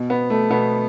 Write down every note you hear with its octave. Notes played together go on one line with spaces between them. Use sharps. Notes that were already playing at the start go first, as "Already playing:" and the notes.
Already playing: B2
B3
A3
B2 B3